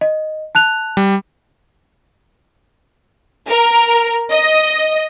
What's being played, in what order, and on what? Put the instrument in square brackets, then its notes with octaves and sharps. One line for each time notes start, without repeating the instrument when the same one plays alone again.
[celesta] D#5
A5 F#6 F7
[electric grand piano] G3
[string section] A#4
D#5